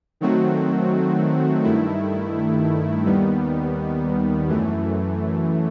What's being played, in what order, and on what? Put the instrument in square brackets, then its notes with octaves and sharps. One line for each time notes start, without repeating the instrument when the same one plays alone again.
[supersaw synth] D#3 F#3 A3 C4 F#4
G2 D#3 A3 E4
D#2 D#3 G3 B3
F#2 E3 A3